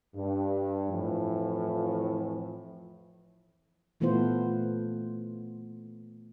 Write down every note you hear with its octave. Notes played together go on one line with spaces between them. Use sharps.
G2
F2 A2 E3 F3
A#2 E3 A3 B3 F4 C5